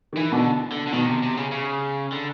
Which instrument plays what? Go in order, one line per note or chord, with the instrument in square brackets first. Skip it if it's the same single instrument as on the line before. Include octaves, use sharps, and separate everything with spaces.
[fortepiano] D#3
[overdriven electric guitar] E3
[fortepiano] B2 [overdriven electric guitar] D3
[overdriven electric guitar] D3
D3
[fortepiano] B2 [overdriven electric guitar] D#3
[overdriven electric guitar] C3
C3
C#3
C#3
D3